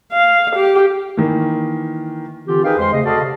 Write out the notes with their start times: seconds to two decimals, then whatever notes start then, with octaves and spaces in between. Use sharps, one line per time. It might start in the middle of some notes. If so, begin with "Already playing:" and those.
0.13 F5
0.56 G4
1.17 D#3 E3 A#3
2.46 D3 E3 C4 F4 G4
2.64 D#4 G#4 A#4 B4 F5 G5
2.78 F2 G#3 C5 C6
2.92 C#3 A3 D#5
3.05 F#4 A4 D5 D#5 F5
3.22 C3